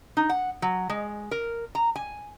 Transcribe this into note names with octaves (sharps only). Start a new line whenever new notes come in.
D#4
F#5
F#3
G#3
A#4
A#5
G#5